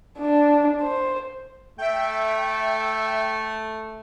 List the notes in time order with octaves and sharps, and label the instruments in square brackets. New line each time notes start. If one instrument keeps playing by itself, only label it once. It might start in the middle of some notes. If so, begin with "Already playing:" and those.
[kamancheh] D4
C5
[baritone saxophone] A3 [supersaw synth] E5 G5